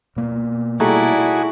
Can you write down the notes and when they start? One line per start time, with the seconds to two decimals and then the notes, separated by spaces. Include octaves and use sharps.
0.16 B2 A#3
0.80 G3 A3 D#4 E4 F#4 G#4 D5